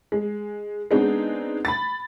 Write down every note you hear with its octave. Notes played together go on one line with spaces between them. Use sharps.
G#3
G#3 B3 C4 D4 D#4 G#4
B5 A6